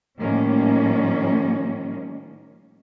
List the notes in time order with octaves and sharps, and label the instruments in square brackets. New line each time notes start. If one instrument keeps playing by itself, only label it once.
[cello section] A2 D#3 F3 G3 A#3 C#4